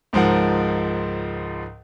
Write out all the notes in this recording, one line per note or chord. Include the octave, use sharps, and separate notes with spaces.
C#2 G#2 F3 A#4 F#5